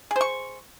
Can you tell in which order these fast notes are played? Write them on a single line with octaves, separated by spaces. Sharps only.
G#4 C5 C#6